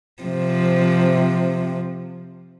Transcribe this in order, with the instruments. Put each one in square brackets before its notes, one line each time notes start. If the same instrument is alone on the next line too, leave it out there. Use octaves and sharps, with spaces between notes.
[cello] C3 F3